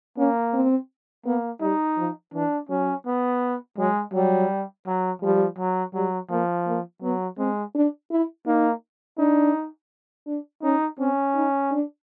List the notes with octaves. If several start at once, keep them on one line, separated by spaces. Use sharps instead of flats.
A#3 C#4
C4
A#3 B3
G3 D#4
F3
E3 D4
F#3 C#4
B3
F#3 G#3
F#3 G3
F#3
F3 G3
F#3
F#3 G3
F3 A#3
A#3
F#3 B3
G#3 C4
D4
E4
A#3 D#4
D4 D#4
D4
C#4 D#4
C4 C#4
D#4
D4